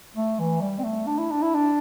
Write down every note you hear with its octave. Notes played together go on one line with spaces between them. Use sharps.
A3
E3
G3
C4
A3
D4
E4
D4
E4
D4